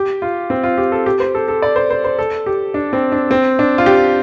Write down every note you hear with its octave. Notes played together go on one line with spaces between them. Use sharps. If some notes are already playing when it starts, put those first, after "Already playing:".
Already playing: G4
F4
C4
F4
G4
A4
G4
C5
A4
A4
D5
C5
C5
C5
A4
G4
D4
C4
D4
C4
D4
F4
G4